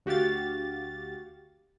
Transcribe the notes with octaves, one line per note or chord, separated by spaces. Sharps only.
D2 F#4 G4 F5 A6